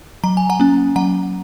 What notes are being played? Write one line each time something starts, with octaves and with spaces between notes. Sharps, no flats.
F#3 A#5
G#5
F#5 A#5
A#3 C#4
F#3 F#5 A#5